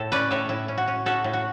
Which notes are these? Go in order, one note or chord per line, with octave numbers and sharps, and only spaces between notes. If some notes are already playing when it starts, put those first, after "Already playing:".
Already playing: A2 A4
C#4 B4 D5
A2 A4 C#5
A2 E4
C#4
F#4
C#4
C#4 F#4 A4
A2
F#4